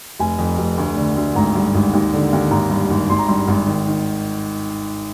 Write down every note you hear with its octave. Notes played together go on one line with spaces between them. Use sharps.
F1 G#5
F2
F1
D2
D3
D2
G#1 A#5
G2
G#1
D#2
D3
D#2
G#1 A#5
G2
G#1
G#1 C6
A#5
G2 C6
G#1
D#3
D#3